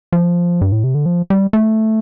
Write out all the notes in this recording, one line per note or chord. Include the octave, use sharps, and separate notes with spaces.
F3
G2
A2
C3
D3
F3
G3
A3